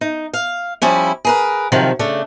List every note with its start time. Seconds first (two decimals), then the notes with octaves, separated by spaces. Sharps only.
0.01 D#4
0.33 F5
0.82 F3 G3 C#4 E4
1.25 G#4 A#4 B4
1.72 C3 D#3 F3 F#3
1.99 C#3 A3 D4